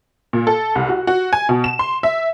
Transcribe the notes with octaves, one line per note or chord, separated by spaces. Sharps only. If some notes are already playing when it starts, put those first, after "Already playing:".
A#2
A4
C2
F#4
F#4
G#5
B2
E7
C6
E5